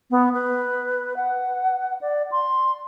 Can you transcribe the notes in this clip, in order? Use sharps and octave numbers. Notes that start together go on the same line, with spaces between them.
B3
B4
F#5
D5
C6